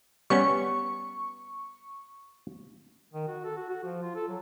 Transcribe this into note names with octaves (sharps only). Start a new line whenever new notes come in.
G3 B3 C#4 C#6
D#3
F#4
A4
F#4
F#4
F3
F4
A4
F#3